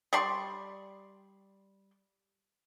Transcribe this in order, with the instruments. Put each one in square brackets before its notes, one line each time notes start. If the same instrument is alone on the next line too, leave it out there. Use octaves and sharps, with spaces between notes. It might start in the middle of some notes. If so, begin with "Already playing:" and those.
[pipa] G3 D5 C6 C#6